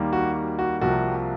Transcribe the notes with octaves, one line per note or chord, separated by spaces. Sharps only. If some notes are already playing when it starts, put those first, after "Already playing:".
Already playing: D#2 D#3 G3 A#3
F#4
F#4
C2 C3 F3 A#3 F#4